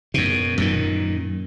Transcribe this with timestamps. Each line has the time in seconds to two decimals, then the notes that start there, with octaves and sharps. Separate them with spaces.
0.14 F#2 B2
0.58 F#2 A#2 D#3